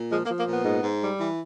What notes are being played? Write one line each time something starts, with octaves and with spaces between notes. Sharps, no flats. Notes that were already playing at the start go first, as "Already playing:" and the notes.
Already playing: A#2
F3 G#3
A#3
F3
A#3
A#2 B3
G#2
G#2
G3
E3